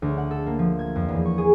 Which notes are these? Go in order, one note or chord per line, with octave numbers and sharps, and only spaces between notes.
D2
F#5
A4
A#3
F3
G#6
F2
E2
C#6
G#4